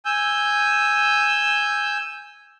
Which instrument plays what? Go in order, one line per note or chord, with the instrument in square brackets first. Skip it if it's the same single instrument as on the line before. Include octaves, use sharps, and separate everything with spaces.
[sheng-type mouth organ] G#5 E6 G6